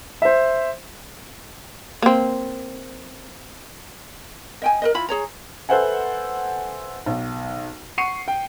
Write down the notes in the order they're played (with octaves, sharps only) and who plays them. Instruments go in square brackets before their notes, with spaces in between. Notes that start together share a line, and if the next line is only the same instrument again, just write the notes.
[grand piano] C5 E5
[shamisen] A#3 C4
[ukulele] D#5 G5 G#5
A#4 B4 D#5
E4 F4 B5
G#4 C#5 A#5
[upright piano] A4 B4 C5 E5 F#5 G#5
B1
F#5 C#6 C7 C#7 D#7
G5